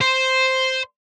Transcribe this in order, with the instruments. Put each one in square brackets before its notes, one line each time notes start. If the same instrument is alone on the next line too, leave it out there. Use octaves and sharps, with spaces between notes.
[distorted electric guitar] C5